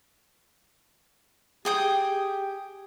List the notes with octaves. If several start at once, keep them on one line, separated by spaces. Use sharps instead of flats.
G4 G#4 G5 D#6